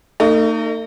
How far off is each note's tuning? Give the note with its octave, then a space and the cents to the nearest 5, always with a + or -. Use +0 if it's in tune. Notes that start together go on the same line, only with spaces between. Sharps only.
A3 +45 D#4 -15